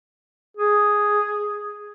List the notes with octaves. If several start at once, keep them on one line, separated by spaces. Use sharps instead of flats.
G#4